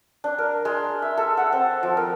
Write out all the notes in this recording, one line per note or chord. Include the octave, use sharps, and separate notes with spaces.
D4
A#4
G#3
E5
A4
F#5
C4
F3
A#4